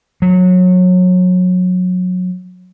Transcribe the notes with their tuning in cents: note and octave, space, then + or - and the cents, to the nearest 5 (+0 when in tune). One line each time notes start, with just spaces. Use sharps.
F#3 -25